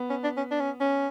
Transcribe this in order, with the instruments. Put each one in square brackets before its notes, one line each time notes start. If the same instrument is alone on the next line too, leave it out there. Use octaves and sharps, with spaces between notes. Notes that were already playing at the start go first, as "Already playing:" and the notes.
Already playing: [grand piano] B3
[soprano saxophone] C#4
D4
C#4
D4
C#4
C#4